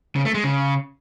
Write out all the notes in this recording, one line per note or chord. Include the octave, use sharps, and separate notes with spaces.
C#3
A3
G#3
C#3